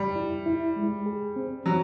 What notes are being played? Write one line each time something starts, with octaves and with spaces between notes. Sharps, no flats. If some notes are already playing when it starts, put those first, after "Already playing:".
Already playing: G3
E4
E4
G#3
G#4
C4
F#3 C4